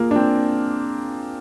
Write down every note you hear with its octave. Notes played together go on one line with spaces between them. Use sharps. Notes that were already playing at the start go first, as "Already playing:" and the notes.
Already playing: A#3 F4 G#4
D4
C4